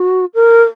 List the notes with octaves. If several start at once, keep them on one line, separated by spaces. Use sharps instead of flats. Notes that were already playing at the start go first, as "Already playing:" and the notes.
Already playing: F#4
A#4